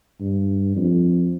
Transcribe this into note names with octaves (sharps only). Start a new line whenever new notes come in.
G2
F2